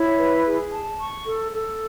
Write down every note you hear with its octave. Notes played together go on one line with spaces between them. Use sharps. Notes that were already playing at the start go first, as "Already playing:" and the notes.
Already playing: E4 C#5
B4
G#4
A5
C#6
A4
A4